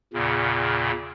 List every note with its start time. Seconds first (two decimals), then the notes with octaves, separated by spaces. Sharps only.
0.14 E2 A#2 C#3